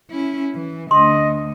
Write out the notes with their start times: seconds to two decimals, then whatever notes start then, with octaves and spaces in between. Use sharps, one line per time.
0.11 C#4 E4
0.55 E3
0.91 D2 D3 D#5 C6